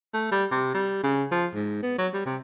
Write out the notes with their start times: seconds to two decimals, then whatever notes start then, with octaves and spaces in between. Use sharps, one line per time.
0.13 A3
0.31 G3
0.51 C3
0.74 G3
1.03 C#3
1.31 F3
1.55 G#2
1.82 B3
1.98 F#3
2.13 G3
2.26 C3